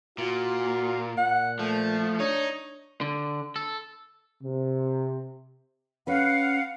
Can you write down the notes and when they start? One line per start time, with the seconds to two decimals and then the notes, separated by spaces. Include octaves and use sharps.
0.18 A#2 F4 F#4
1.18 A#2 F#5
1.59 F3 A3
2.20 D4 D#4 C#5
3.01 D3
3.56 A4
4.42 C3
6.07 C#4 B4 F5 F#5